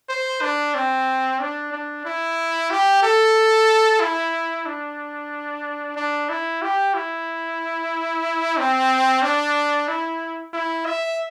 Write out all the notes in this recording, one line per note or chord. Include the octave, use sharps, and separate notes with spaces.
C5
D4
C4
D4
D4
E4
G4
A4
E4
D4
D4
E4
G4
E4
C4
D4
E4
E4
E5